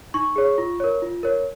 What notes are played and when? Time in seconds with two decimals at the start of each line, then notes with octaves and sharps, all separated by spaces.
0.14 D#4 C#6
0.36 G#4 C#5
0.58 F4
0.80 A#4 C#5
1.02 F4
1.23 A#4 C#5